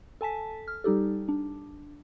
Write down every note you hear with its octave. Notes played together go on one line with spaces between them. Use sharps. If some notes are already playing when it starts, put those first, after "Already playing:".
A4 G#5 A5 B6
F6
G3 D#4 G4 A4
D4